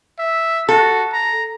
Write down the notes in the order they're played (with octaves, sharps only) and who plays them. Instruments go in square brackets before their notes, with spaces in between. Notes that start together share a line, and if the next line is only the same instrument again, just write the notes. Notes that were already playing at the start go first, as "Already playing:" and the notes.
[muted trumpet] E5
[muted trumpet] F#4 [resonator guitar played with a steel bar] A4
[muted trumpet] A#5